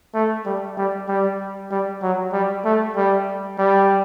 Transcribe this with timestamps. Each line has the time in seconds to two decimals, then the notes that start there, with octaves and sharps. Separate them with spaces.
0.14 A3
0.45 G3
0.78 G3
1.08 G3
1.71 G3
2.02 F#3
2.33 G3
2.65 A3
2.96 G3
3.58 G3